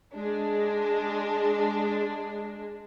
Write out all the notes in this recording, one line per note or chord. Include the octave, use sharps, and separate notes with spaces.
G#3 D4